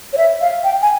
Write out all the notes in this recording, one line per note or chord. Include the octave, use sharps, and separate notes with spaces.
C#5
E5
F5
G5
G#5